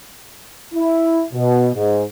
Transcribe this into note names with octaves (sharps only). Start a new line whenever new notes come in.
E4
B2
G#2